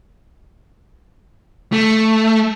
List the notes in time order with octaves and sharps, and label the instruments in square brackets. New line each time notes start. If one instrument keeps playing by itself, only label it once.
[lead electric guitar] A3